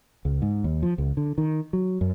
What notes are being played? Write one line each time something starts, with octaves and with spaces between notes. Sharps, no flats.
C#2
G#2
D#2
F3
C#2
D3
D#3
F#3
F#2